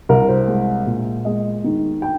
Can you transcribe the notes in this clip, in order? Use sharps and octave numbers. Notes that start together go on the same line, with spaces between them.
C2 A#4
C5
G#3
A#2
G#3 D#5
D#3
G5